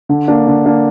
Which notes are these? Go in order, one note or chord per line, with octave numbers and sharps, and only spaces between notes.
D3
A#3 D4
D3
A#3 D4